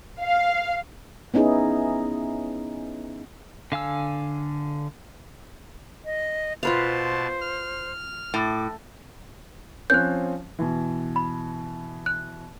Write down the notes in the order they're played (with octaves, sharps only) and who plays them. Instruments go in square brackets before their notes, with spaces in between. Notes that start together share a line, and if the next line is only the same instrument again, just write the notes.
[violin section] F5
[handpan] B3 C#4 D#4 E4 G#4
[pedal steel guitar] D3 F5 G#5 E6
[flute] D#5
[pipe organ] B2 A5 [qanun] F4 B4 F5 [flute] C5
[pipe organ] F6
[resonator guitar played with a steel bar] A2 [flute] D6
[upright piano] F3 C4 C#4 [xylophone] F#6 G6
[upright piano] B2 E3
[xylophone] B5
F#6